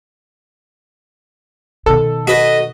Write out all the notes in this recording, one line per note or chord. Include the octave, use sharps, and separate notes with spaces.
B2 D#3 A4
F#4 B4 D#5